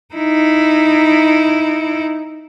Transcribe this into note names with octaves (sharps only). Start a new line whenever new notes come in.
D#4 E4